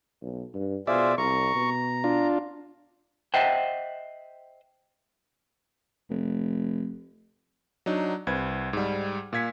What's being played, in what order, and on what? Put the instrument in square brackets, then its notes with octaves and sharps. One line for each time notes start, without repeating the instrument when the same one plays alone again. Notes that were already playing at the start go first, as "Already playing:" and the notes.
[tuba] B1
G2
[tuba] B2 [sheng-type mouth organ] F4 G#4 C5 [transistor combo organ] D5 E5
[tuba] C2 [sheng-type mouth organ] A#5 [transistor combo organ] C#6
[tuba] B2
[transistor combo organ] D4 F4
[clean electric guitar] C5 D#5 E5 F#5 G5
[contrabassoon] F1
[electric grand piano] F#3 D4 D#4
C2 B4 C5 G#6
G#2 G3
A#2 F5 G#6 B6 C#7